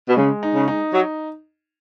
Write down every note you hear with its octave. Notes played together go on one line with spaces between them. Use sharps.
B2
C#3 G#3
D#4
C#3
D#4
F#3